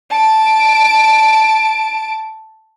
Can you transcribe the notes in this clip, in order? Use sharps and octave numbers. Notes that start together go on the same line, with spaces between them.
A5 D7